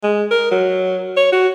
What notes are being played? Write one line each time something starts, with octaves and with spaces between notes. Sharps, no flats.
G#3
A#4
F#3
C#5
F#4